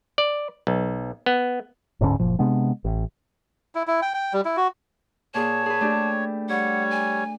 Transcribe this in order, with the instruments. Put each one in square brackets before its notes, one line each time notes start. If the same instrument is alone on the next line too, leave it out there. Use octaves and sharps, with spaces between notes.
[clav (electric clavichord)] D5
B1
B3
[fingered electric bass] D1 G#2 D3 C#4
F#1 A#2 F3
C3 G#3 B3 D4
A1
[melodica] E4
E4
G5
G5
G3
E4
F#4
[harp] A#2 G#4 [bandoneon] C#5 [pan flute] A5
[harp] G#4 B4
A3 D4 G4
[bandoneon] G3 C#5 [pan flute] F#5
[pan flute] G#5